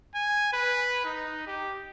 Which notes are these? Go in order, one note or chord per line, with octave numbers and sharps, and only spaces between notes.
G#5
B4
D#4
G4